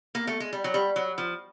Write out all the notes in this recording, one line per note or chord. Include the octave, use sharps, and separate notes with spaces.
A#3
A3
G#3
G3
F#3
G3
F#3
F3